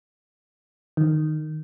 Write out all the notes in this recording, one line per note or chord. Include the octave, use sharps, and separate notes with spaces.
D#3